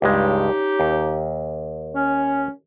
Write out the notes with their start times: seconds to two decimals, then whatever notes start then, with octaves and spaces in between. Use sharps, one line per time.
0.02 C#2 G2 G#3 C#4 D#4 G4
0.80 D#2
1.95 C#4